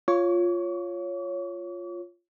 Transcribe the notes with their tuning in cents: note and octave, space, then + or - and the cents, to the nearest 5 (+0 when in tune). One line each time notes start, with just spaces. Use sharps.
F4 +0 C#5 +0 D6 -45